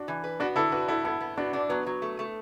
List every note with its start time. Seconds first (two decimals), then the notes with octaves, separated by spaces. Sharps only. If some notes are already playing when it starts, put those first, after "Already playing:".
Already playing: D4 F#4
0.08 E3
0.24 B4
0.40 B3 D4 F#4
0.56 D3 E4 A4
0.72 D4 F#4 B4
0.88 B3 E4 A4
1.04 B3 E4 A4
1.20 B3
1.37 B3 D4 F#4
1.53 D4
1.69 F#3 B3
1.86 F#3
2.02 A3
2.19 A3